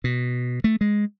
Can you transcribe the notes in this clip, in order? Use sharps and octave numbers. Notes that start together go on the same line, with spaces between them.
B2
A3
G#3